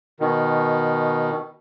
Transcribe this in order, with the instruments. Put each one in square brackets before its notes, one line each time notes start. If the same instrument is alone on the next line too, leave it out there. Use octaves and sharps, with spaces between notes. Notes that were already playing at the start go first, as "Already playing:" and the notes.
[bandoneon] B2 D#3